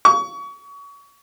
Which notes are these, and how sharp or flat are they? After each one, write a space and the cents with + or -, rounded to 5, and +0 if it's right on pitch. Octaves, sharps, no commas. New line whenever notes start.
C#6 +30